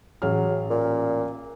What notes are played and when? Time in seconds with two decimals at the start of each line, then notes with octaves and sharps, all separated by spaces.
0.22 A1 F#3 G#4 F6
0.70 A#2